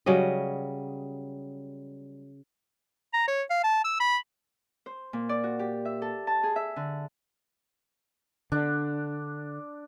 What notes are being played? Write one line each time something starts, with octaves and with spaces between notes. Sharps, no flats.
C#3 F#3 G3 D#5
A#5
C#5
F5
A5
E6
B5
C5
A#2
D5
F#4
G4
E5
A4
A5
G#4
E5
D3
D3 D4